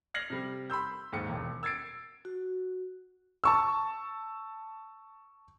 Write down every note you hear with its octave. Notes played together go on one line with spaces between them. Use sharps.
F6 G#6 A#6 C7 F#7
C3 G3
B5 C6 E6 G6
D#2 G#2 C#7
E1 D#2
E6 G#6 A6 C7 D7
F#4
A5 C#6 E6